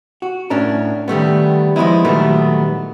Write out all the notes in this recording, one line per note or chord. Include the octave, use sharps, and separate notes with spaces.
F#4
A2 C#4 D4 A#4
D#3 G3 A3 B3
F3 G#3 B3 D#4 E4
A#2 D#3 F#3 G3 A3 B3